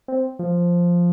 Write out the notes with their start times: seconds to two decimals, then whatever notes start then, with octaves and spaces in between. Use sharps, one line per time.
0.08 C4
0.39 F3